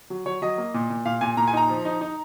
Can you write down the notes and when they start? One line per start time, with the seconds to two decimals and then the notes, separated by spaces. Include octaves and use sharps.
0.10 F#3
0.26 F#3 C#5
0.42 F#3 D#5
0.58 A#3
0.74 A#2
0.90 A#2
1.05 A#2 F5
1.21 A#2 G#5
1.37 A#2 A#5
1.47 G#5
1.53 D#4 A#5
1.70 F3
1.85 D#4
2.01 D#4